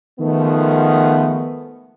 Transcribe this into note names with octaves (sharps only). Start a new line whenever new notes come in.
D#3 F3 G#3 A3 B3